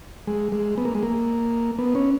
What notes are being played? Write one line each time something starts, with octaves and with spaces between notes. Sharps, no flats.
G#3
G#3
B3
A#3
G#3
A#3
B3
C#4